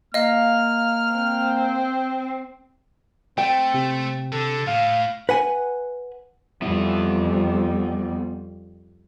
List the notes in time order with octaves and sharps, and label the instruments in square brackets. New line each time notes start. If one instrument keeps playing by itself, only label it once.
[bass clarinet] A#3 [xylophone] D#5 F5 [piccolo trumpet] F6
[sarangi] C4
[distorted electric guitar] A3 [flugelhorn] C4 [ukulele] G5
[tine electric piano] C3
[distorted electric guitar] D3 [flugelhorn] A4
[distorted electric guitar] A2 [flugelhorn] F5
[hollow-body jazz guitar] B4 F#5 G#5
[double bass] F2 G3 [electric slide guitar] B3 E4 E5